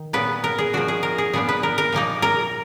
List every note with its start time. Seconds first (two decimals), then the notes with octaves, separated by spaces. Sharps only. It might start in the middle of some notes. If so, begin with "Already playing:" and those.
Already playing: D#3
0.13 A#2 F#3 B3 B4
0.44 A#4
0.58 G#4
0.73 F3 G#3 D4 F#4
0.88 G#4
1.03 A#4
1.18 G#4
1.33 A#2 F3 B3 D4 G#4
1.49 B4
1.63 A#4
1.78 A#4
1.92 A#2 F3 A#3 D#4
2.22 A#4